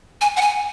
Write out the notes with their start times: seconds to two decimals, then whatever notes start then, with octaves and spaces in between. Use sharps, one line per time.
0.21 G#5
0.36 F#5
0.41 G#5